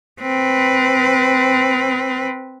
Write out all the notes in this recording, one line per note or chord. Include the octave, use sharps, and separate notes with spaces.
C4 B4